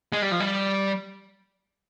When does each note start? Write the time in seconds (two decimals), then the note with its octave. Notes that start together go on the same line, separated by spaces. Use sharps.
0.13 G#3
0.22 G3
0.31 F3
0.40 G3